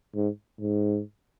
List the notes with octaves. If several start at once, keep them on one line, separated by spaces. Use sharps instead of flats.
G#2
G#2